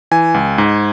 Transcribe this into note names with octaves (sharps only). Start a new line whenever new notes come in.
E3 G#5
C#2
G#2